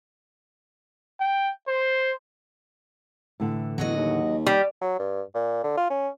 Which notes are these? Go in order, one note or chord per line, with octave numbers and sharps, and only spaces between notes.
G5
C5
A2 D3 E3
E2 F#3 F#4 D#5
D#2
G3
F#3
G2
A#2
D3
F4
C#4